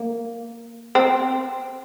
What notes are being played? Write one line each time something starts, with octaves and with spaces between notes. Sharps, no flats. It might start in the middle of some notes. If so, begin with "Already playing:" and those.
Already playing: A#3
C4